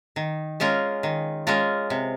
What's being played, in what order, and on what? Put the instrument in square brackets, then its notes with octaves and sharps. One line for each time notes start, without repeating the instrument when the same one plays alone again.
[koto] D#3
G#3 C#4 F4 A#4
D#3
G#3 C#4 F4 A#4
C3